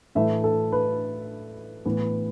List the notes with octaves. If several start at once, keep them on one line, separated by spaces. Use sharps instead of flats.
A2 E3 A3 E5
A4
B4
A2 E3 B3